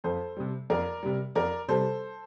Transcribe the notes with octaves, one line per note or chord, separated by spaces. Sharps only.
F2 A4 C5
C3 G3
F2 A#4 D5
C3 G3
F2 A#4 D5
C3 G3 A4 C5